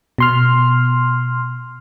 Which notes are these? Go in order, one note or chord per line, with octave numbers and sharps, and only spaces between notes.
B2 C6 F6